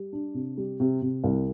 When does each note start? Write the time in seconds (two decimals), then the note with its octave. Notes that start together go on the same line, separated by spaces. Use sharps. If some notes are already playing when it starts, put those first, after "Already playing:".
Already playing: G3
0.13 D4
0.34 C3
0.57 G3
0.80 C3
1.02 C3
1.24 C2